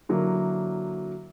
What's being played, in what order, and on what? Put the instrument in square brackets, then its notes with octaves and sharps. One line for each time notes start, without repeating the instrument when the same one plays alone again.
[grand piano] D3 F#3 A#3 E4